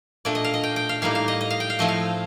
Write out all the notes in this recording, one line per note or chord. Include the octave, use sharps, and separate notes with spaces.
A#2 A3 D4 D5
D#5
F5
D#5
G5
G5
F5
A2 G3 A#3 D#4 F5
F5
D#5
D#5
F5
G5
F5
A2 F3 A3 C4 D#5
F5